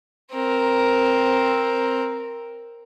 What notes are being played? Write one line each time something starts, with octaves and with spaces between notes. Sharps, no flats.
C4 A#4